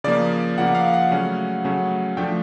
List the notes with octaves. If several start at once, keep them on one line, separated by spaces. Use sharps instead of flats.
C#3 F3 A#3 D5
C#3 F3 A#3 F#5
F5
F#5
C#3 F#3 A3 C#4
C#3 F#3 A3 C#4
F3 A3 D4 G5